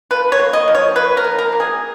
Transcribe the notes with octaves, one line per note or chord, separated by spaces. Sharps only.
F3 B4
C#5
A#3
D#5
F3
C#5
A#3 B4
A#4
F3
A#4
A#3
G#4